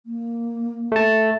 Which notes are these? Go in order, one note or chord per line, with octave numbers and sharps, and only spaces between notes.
A#3
A3 A5